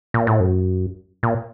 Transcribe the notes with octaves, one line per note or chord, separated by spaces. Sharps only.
A#2
A2
F#2
A#2